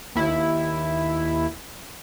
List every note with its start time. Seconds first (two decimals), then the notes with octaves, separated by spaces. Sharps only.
0.15 D#2 E4